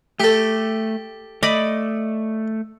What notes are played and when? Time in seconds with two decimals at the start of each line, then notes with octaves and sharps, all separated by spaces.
0.20 A3 G4 A4
1.43 A3 D5 D#5 B5